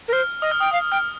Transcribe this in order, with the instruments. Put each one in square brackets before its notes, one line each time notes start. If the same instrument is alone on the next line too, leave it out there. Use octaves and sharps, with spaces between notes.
[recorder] A#4
[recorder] C5 [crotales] F6
[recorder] D#5 [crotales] D#6
[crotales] F6
[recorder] G5 [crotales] D#6
[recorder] F5 [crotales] D#6
[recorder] G5 [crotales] F6